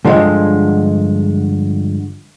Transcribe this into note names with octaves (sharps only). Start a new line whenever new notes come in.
G2 D3 F3 G#3